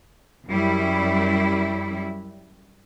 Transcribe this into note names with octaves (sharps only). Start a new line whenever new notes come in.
F#2 G3 E4